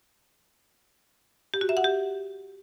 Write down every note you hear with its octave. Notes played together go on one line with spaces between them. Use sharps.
G4
F#4
E5
F#5
G4